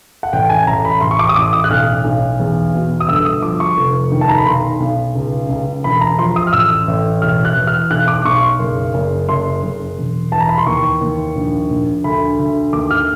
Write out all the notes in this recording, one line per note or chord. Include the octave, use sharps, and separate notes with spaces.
F#5
A1 G5
G#5
A1 A#5
B5
A1 C6
C#6
D6
D#6
A1 D6
D#6
F#6
B1 F6
B1
E2
B2
D#6
G1 E6
D#6
F3 D6
C#6
F1
D#3
A5
A#5
B5
B1 C6
B1
C#2
C#2
E1 B5
A#5
F3 C6
D#6
F6
A1 E6
A1
E1 F6
F#6
E3
F6
B1 F#6
D6
B1 C#6
C6
F#1
F#1
F#1 C6
F#1
E1
E3 A5
A#5
B5
C6
D#2 C#6
D#2
A#1
A#1
D2 B5
D2
D#2 D6
F6